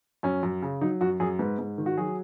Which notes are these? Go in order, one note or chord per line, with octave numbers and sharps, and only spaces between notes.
F#2 C#4
F#2
C#3
F#3 D#4
F#2 F#4
F#2 G#4
G#2 B4
G#2
D#3
F#4
F#3 G#4